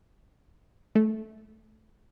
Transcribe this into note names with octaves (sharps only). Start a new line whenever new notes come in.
A3